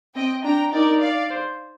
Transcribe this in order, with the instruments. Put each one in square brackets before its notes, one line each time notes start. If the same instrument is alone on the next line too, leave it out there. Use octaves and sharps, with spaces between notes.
[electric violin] C4 [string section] D#5 G5
[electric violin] D4 [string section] G5 A#5
[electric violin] D#4 [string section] A#4 D5
[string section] D5 F5
[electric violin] C5